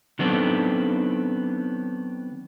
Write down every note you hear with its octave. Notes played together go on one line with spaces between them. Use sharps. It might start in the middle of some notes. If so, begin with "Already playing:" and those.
D#3 F#3 B3 C4 D4 A4